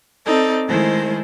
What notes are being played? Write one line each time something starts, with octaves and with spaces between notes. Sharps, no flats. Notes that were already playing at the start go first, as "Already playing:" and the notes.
C4 D#4 A4 D5
D#3 G#3 A3 E4 G#4 C5